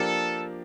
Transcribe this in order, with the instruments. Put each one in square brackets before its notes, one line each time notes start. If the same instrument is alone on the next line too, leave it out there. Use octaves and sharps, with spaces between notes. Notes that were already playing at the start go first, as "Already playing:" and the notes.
Already playing: [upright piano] F3 A#3 D4 G4 A#4 [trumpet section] A4